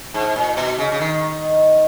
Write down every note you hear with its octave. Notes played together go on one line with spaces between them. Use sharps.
G#2
A#2
B2
C#3
C#3
D#3